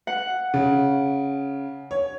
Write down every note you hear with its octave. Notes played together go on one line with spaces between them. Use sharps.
F#5
C#3
C#5